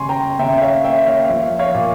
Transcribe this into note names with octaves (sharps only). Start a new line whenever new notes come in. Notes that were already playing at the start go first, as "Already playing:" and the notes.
Already playing: C#3 G3 G#5 C6 C#6
G5 A#5
C#3 E5 G5
E5
C#5 F5
A#3 E5 G5
G5
C#5 F5
F5
F3 E5
C#5 F5
A#2